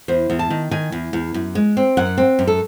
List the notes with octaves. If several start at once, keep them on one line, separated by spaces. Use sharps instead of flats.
E2 C5
E2
A5
D#3
D#3 G#5
E2
E2
F#2
G#3
C4
F#2 F#5
C4
F#2
A4